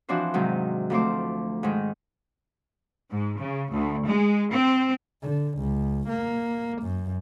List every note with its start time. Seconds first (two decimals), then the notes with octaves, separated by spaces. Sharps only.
0.09 E3 F3 C4 D4 F#4 C5
0.34 G#2 C3 D#3 F#3
0.90 D2 F3 A3 C4 C5 D6
1.63 G#2 D#3
3.11 G#2
3.39 C#3
3.72 D2
4.07 G#3
4.51 C4
5.23 D3
5.58 C#2
6.09 A#3
6.83 F#2